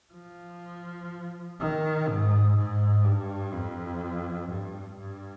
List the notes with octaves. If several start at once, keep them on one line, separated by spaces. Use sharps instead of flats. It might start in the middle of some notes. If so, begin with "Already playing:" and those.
F3
D#3
G#2
G#2
G2
F2
G2
G2